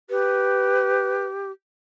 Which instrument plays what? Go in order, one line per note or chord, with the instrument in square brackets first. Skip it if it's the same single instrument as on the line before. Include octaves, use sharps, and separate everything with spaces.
[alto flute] G4 [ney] B4